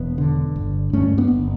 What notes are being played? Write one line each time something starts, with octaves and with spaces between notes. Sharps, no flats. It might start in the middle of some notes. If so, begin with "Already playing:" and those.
Already playing: E1 B3
D3
G1
G2 A3 C#4
B3 D4
G1